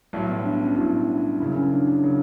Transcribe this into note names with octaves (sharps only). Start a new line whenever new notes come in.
B1 A2 F#3 G3
B3
D4
C#4
D4
B1 A2 F#3 E4
E4
D4
F#1 F#2 C#3 F#3 E4
C#4
D4
D4
C#3 F#3